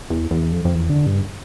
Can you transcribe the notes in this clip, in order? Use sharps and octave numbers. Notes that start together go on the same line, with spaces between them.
E2
E2
F2
F2
E2
D3
G2